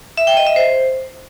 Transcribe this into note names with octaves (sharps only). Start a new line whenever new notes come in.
E5
G5
D#5
E5
C5